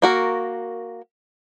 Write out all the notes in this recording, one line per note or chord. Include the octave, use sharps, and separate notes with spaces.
A#3 F#4 A#4